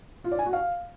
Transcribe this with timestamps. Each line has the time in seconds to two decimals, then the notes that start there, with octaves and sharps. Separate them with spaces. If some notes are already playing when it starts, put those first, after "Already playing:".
0.24 F4
0.32 D5
0.39 G#5
0.46 F#4
0.53 F5